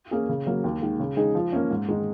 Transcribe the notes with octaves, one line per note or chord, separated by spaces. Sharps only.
A#3 C#4 G#4
C#3
F#3 A#3
D#2
D#3 G#3
C#3
G#3 D#4 G#4
F3
A#3 C#4
G#2
D#3 G#3 D#4